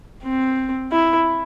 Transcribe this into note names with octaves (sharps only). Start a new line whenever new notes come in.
C4
E4